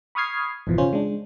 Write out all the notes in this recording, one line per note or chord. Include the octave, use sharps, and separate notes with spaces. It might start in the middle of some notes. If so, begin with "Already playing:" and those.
B5 C#6 D#6 F6 G#6 C7
G#1 F2 B2 E3 F3
C#3 C#4 F4 C5
G#3 D4